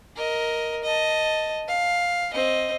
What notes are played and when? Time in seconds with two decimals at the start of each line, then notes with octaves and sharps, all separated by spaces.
0.16 A#4 D#5
0.83 D#5 A5
1.68 F5
2.33 C4 D#5